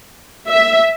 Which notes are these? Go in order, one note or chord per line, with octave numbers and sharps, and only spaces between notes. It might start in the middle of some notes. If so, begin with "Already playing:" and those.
E5